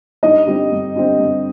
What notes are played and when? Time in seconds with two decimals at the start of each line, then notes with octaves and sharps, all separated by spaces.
0.23 G2 D#4 D#5
0.47 D3 G3 C4
0.72 G2
0.96 D3 G3 C4
1.20 G2